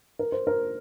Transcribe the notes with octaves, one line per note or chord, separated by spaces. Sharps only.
A#4
C5
A#4